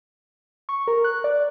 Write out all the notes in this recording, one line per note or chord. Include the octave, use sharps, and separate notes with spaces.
C#6
A#4
F#6
D5